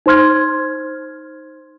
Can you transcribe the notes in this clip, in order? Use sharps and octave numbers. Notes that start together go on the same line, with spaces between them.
D#4 C5 C6 F6 G#6